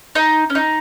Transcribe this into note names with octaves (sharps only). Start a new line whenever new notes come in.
D#4
C#4
D#4